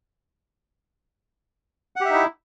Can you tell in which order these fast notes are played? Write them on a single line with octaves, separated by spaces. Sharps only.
F#5 G4 E5 D#4 E4